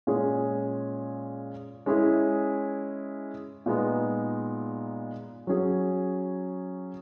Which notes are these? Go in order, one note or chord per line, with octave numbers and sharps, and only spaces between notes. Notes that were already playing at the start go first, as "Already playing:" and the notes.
A#2 G#3 C#4 G#4
G#3 C#4 E4 G#4
A#2 G#3 B3 D#4
F#3 C#4 G#4